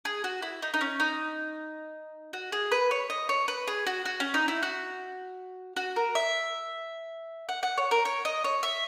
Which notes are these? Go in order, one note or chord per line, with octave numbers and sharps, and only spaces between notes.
G#4
F#4
E4
D#4
D#4
C#4
D#4
F#4
G#4
B4
C#5
D#5
C#5
B4
G#4
F#4
F#4
C#4
D#4
E4
F#4
F#4
A#4
E5
F#5
F#5
C#5
A#4
C#5
D#5
C#5
E5